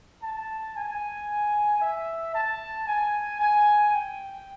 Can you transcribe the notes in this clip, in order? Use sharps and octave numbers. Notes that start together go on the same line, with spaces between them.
A5
G#5
E5
A5
G#5
G#5
G5